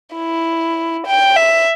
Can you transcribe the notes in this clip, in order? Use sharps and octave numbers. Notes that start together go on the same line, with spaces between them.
E4
G5
E5